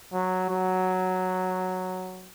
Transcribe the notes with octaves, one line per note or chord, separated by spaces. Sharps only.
F#3
F#3